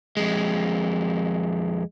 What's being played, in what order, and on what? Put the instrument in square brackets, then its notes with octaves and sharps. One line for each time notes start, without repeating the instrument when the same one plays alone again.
[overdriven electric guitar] F2 G#3